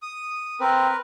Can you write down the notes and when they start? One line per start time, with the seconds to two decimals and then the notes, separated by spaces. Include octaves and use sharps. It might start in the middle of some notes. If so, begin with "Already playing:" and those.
0.02 D#6
0.60 C4 A#4 B4